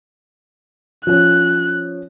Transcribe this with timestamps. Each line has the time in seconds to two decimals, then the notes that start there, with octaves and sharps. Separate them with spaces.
1.07 F3 C#4 F#6